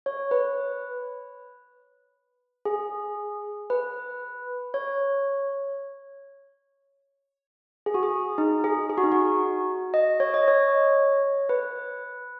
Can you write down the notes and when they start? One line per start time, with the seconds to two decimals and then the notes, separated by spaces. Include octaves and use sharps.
0.06 C#5
0.31 B4
2.65 G#4
3.70 B4
4.74 C#5
7.86 G#4
7.94 F#4
8.03 G#4
8.38 D#4
8.64 G#4
8.90 G#4
8.98 F#4
9.04 D#4
9.12 F#4
9.94 D#5
10.20 C#5
10.34 D#5
10.48 C#5
11.49 B4